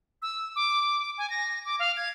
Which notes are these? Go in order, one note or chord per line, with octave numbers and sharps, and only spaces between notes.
E6
D6
G#5
A#6
D6
F5
G#6